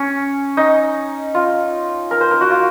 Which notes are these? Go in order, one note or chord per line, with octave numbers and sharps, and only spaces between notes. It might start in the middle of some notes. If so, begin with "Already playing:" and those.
Already playing: C#4
D#4
F4
A#4
C5
A#4
F#4
F4